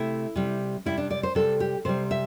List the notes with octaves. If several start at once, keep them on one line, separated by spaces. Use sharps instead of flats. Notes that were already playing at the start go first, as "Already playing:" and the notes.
Already playing: C3 A3 E4
C3 G3
C3 G3 E4
D4
D5
C5
C3 G3 A4
G4
C3 G3 C5
E5